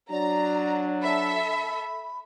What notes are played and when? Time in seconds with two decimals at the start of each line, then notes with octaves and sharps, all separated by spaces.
0.11 F#3 D4 D5 A#5
1.02 A4 E5 B5